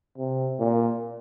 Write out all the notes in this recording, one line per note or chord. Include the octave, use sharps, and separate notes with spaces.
C3
A#2